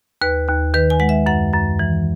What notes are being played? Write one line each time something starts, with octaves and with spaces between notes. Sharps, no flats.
D#2 B4
D#2
D#3 B4
G#5
G#3 F#5
E5
F#2 F#5
F#2
E3